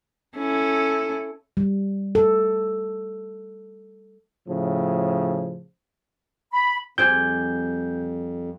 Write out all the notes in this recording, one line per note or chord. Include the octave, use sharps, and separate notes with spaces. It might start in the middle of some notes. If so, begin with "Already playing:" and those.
C#4 E4 A4
G3
A4
A2 C#3 F3
B5
F2 G3 C4 G#4 G6